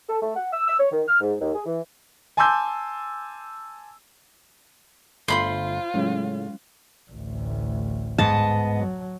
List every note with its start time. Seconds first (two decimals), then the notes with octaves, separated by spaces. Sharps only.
0.09 A4
0.22 A3
0.36 F#5
0.53 E6
0.67 E6
0.80 C#5
0.92 D#3
1.08 F6
1.21 G#2
1.41 D#2
1.54 G#4
1.66 E3
2.37 G#5 A5 C6 D6 E6 G6
5.28 G1 A3 F4 C5 B5 C6
5.94 A2 C#3 F#3 G#3 C#4
7.11 A1 D2
8.18 G#2 B3 D#5 A5
8.78 F#3